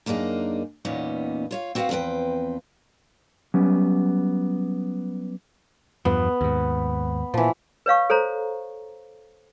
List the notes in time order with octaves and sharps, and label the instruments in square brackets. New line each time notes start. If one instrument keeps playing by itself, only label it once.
[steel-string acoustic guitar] F#2 A#3 D4 D#4 G#4
E2 A#2 B3 C#4 D#4
F4 C#5 F5
C4 F#4 B4 C5 F5 F#5
E2 F3 C4 B4 G5
[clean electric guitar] F#3 G3 B3 C#4
[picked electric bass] E2 G2 F3 [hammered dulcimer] B3
[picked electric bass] D#2 G#2
[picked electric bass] A#2 [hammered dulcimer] E3 F3
[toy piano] B4 C#5 F5 C#6
A4 C5 C#5 A#5